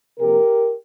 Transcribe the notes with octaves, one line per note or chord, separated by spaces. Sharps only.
C3 F3 A#3 G4 A#4